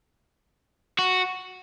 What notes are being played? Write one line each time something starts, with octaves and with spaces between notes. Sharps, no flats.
F#4